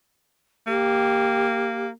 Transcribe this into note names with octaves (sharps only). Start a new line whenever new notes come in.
A#3 G4